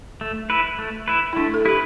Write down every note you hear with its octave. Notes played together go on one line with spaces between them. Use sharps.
A3
E4 B4
A3
E4 B4
E4
A3 D4
A4
E4 G4 B4